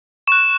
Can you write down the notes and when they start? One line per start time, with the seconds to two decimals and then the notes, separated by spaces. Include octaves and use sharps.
0.27 C#6 F#6 E7